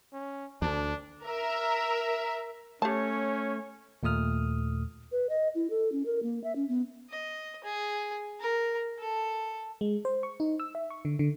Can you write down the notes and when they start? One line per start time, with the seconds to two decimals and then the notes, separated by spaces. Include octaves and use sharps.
0.13 C#4
0.62 D2 D4
1.25 A#4 E5
2.82 A3 C#4 G4 C#5 A5
4.03 D#2 A#2 A3 D#6 F6
5.12 B4
5.29 D#5
5.55 E4
5.70 A4
5.92 C#4
6.06 A#4
6.23 A#3
6.44 E5
6.56 C#4
6.69 B3
7.10 D#5
7.64 G#4
8.40 A#4
8.99 A4
9.81 G#3
10.05 C5
10.23 C#6
10.40 D#4
10.60 E6
10.75 E5
10.90 C#6
11.05 D3
11.19 D3